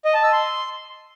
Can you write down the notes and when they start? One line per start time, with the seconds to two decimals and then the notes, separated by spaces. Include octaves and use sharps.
0.05 D#5
0.14 A5
0.23 E6
0.32 C6